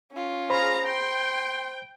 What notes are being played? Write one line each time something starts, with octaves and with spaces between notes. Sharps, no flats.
C#4 F4
G#4 C5 F5 A#5 B5
G5 C6